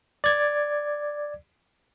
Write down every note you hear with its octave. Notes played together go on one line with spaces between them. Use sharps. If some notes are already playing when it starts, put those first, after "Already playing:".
D5 G#6